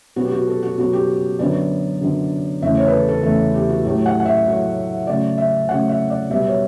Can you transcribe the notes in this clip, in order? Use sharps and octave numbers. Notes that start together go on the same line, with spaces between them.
B2 F#3 B3 F#4
G4
F#4
A4
F#4
B2 F#3 B3 F#4
G4
F#2 D3 F#3 B3 D5
F#2 D3 F#3 B3
E2 C#3 E3 A3 E5
C#5
B4
A4
A4
E2 C#3 E3 A3 A4
G4
F#4
A2 F#3 A3 G4
F#5
F#5
E5
A2 F#3 A3
C#3 F#3 A3 D5
E5
C#3 F#3 A3 F#5
E5
D5
B2 G3 B3 E5
C#5